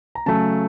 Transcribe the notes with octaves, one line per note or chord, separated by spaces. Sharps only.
A#5
C#3 F#3 A3 A5